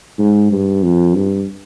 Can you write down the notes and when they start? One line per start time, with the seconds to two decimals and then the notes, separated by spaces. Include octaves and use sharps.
0.18 G#2
0.52 G2
0.84 F2
1.16 G2